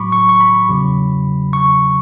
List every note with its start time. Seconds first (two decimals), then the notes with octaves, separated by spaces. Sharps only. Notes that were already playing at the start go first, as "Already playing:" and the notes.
Already playing: A1 A2 F#3 B5 C#6 D6
0.12 C#6
0.29 C#6
0.40 B5
0.69 E2 C#3 F#3
1.53 C#6